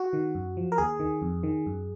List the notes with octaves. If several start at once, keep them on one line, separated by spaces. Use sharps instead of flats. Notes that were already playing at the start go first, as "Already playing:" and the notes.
Already playing: F#4
D#3
F#2
F3
A#4
D#2 G#4
D#3
F2
D#3
F#2